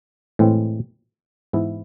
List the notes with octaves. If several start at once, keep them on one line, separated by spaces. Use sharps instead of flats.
A2 E3 G#3 C4
G#2 E3 B3 E4